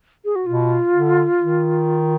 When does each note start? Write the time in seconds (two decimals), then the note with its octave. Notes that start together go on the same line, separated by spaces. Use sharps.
0.25 G#4
0.36 F#4
0.46 B2 F4
0.93 D3
1.39 D#3